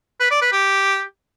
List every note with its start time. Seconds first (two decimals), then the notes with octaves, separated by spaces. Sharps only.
0.20 B4
0.31 D5
0.42 B4
0.52 G4